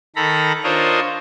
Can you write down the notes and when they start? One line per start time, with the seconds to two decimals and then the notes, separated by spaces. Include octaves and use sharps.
0.16 D#3 A4 A#5 B5
0.64 D4 F4 A#4 C5 C#5 D#5